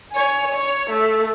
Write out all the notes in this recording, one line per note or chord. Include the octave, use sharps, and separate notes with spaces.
C#5 G#5
C#5
A3